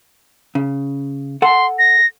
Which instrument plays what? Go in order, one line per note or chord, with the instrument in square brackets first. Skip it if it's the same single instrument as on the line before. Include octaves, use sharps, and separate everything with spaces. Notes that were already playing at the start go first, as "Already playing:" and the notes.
[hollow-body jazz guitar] C#3
[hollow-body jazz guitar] A4 F#5 [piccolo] C6
[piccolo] A#6